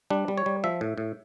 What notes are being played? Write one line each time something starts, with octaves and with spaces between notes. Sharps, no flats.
G3 D4
G3
C#5
G3
F3 E5
A2
A2